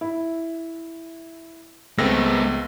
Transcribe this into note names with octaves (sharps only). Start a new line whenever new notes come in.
E4
C#2 G#3 A3 B3 C4 E6 A#6